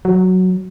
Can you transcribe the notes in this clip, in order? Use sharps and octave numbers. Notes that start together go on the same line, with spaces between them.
F#3